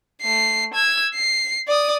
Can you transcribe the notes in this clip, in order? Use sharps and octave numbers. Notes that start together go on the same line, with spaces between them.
A3 C7
E6 G#6
C7
D5 D#6